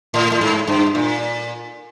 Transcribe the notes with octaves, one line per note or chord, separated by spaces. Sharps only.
A2
A2
G#2
G2
A#2